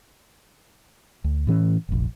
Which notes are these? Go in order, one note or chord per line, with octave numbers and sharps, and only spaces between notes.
D2
A2 E3 C#4
F1 A#1